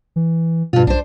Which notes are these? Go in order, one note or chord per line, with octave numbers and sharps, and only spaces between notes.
E3
G2 B2 F4
B1 D4 C5